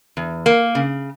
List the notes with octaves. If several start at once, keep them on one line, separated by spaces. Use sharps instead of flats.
E2
A#3
C#3